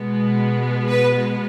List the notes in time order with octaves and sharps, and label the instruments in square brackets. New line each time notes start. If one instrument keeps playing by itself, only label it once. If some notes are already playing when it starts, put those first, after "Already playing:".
Already playing: [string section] B2 G#3 B3
B4